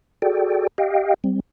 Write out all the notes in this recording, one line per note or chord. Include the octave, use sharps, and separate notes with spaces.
F#4 G#4 A4 D5 G5
G4 D#5 F5 G5
G3 C4